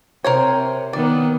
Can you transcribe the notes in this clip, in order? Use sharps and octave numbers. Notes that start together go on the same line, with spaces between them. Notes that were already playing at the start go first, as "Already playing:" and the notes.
C3 A#4 C5 C#5
D#3 B3 D5